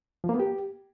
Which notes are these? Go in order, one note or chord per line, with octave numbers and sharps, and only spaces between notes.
F3
A#3
B3
G4